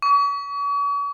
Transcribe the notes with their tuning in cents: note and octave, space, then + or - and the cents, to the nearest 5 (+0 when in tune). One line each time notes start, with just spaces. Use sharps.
C#6 +40